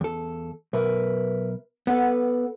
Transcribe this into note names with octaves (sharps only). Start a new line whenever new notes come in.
E2 A4
B1 A#4 B4 E5
B3 A4 B4 F#5